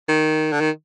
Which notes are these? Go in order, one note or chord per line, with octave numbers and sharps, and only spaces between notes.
D#3
D3
D#3